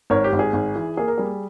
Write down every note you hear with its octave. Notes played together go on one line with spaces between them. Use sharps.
G#1 A#4 C#5
G4
G#1
G#4
G#1
E3
A#3 G#4
A#4
G3 G#4